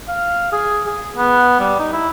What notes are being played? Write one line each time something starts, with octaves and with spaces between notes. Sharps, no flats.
F5
G#4
G#4
B3
G3
D#4
E4